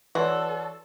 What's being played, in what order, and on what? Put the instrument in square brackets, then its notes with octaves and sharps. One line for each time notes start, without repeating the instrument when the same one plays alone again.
[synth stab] E3 [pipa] F#4 [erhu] A4 [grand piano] C#5 D5 C6